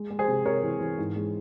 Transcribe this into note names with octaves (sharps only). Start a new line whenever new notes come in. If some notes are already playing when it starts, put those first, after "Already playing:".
Already playing: G#3
G#3
G#4 C5
C3
C3 A#4 C#5
E3
E3
G#2
G#3